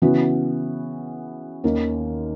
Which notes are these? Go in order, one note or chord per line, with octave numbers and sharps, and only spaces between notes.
C#3 E3 B3 F#4
D#2 D#3 A#3 C#4